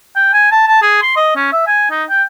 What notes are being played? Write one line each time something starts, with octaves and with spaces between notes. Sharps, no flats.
G5
G#5
A5
A5
G#4
C6
D#5
C#4
E5
G#5
D#4
G5